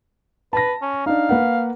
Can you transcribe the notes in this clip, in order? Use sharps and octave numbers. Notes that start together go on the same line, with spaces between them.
B4 A5 A#6
C#4
D4 D#4 F5
A#3 B4 F#5